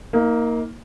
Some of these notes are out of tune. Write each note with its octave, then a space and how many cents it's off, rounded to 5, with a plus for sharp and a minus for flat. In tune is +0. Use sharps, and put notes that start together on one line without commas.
A#3 +0 D#4 +35